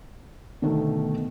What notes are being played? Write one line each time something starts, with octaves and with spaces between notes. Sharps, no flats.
B2 D3 D#3 A3